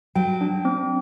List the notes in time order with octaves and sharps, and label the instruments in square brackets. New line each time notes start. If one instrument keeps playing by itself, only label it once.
[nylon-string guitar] F#3 [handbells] G5
[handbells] D4
C4